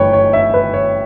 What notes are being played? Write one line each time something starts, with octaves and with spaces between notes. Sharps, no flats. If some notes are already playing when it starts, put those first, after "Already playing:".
Already playing: G1 F#2 E3 A3 B4 C#5 G5
C#5
E5
B4
C#5